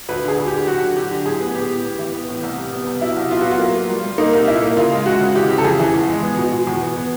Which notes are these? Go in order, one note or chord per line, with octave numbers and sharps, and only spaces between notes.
D2 B4
D3 G#4
D2
G4
D3
F#3 F#4
D3
F#3 G4
D3
A2 G#4
B3
B3 G4
A2
B3
E3
B3
A2
C2
C2
B3
C2
F#3 E4
C2
B3 F4
F#3 F#4
F4
A#3
A#3
G3
G3
A#3 D#4
C2
A#2 E4
A#3
C#3 F4
G#3
G#3 F#4
C#3
E3 G4
C#3
A4
F2 G#4
E3
E2
G#3
B3
B2
B2
E2
B3
B3